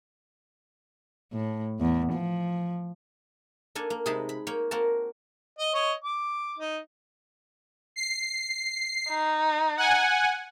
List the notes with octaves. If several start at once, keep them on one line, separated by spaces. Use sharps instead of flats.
A2
E2
F3
A#3 D4 A4 G#5
A#3
C3 G#3 D#4 G#4 A5 B5
B5
A#3 C#5 G5
A#3 C4 F#4 A#4 A5
D#5
C#5 D#5
D6
D#4
C7
D#4
F#5 G#5